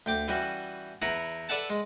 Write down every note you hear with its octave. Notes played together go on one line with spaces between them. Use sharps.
D2 G5 D6
E3 G3 C#4 F#4
E2 E4 B4 A#5 C#6
A4 B4 D5 E5 F#5 A5
G#3